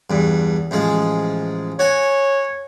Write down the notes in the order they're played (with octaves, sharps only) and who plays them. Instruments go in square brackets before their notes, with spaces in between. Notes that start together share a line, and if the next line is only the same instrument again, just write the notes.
[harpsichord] E2 G2
A1 F3 G#3
[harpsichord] F#4 G#5 [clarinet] C#5